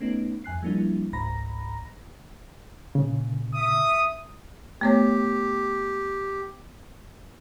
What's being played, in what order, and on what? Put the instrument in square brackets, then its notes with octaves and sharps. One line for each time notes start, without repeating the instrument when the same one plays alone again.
[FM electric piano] A3 B3 C#4 D#4
F2 G#5 F#6 C7
F3 G3 A#3 D4 E4
G1 C#2 G#2 A#5 B5 A#6
[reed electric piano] A#2 C#3
[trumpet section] E5 D#6
[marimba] A3 B3 C#5 [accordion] G4